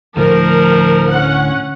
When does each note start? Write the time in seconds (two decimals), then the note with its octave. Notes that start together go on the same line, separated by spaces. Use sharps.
0.17 D2 A2 F3 A#4
1.11 C#4 F#5